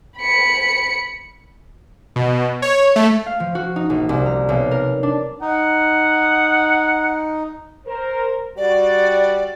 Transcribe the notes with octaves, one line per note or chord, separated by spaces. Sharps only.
B5 C#7
B2
C#5
A3
F5
F3
F#4
D#4
A#1
C2
A#5
B1
A#4
D4
D#4 F#5
A#4 C5
G3 F#4 D5